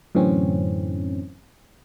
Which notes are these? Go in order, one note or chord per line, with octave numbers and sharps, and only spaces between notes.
F#2 A2 D3 E3 C4 C#4